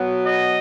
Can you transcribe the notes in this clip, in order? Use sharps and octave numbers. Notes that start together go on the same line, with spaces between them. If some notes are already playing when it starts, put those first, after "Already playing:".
Already playing: B2 F#3 B3
D#5